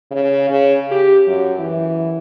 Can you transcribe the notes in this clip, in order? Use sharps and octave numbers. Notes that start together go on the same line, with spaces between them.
C#3
C#3
G4
F#2
E3